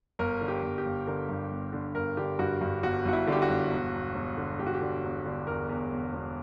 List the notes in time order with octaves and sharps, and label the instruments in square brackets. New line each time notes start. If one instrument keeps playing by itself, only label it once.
[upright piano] G1 A#4
D3
G4
G1
G4
G1
D3 A#4
G2
G1
D3
G1 A#4
D3 G4
G2 F#4
G2
G1 F#4
G1 F#4
E4
D3 G4
F#4
G1
E1
E1
E1
D3
E1 G4
F#4
G4
D3
E1
D3
E2 A#4
E2
E1
E1